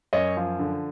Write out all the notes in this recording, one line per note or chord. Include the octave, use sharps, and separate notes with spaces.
F#2 C#5 D#5
F3
D3